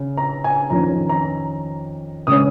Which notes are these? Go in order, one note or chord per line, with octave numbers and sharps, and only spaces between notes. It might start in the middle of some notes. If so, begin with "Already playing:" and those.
Already playing: C#3 C#4
A#5
G#5
F2 D#3 C#4 A#5
A#5
C#3 G#3 C#4 D#6